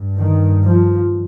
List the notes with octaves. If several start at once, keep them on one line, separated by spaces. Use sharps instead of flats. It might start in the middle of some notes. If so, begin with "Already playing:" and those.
Already playing: G2
D#3
F3